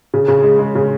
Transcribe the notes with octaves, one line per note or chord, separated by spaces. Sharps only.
C#3
C#3
G#3
G#3
C#3